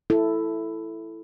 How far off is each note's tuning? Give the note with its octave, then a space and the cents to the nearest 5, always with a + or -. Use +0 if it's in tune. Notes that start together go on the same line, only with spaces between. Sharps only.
E4 +5 A4 +0